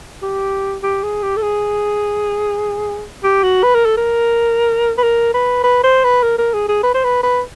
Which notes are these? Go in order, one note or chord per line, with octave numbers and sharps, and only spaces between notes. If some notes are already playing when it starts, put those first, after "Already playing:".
G4
G4
G#4
G4
A4
G#4
G4
F#4
B4
A#4
A4
A#4
B4
A#4
B4
B4
C5
B4
A#4
A#4
G#4
G#4
B4
C5
B4
B4